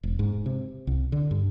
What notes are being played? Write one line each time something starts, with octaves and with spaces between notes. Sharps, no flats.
E1
G#2
C3
C2
D3
G2